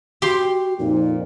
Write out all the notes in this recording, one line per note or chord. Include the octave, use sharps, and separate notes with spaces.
F#4 G4 C6
F2 A#2 D#4